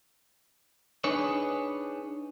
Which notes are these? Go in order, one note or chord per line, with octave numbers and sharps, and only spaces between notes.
D4 D#4 G#4 B4 C#5